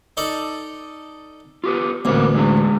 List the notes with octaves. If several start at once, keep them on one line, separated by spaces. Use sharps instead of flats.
D#4 A4 D5
F4 G4 B4
A1 D2 A#3 A#4 B4
G#3 D4 G#4